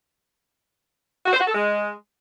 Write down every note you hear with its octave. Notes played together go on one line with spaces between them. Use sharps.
F#4
C5
F#4
A4
G#3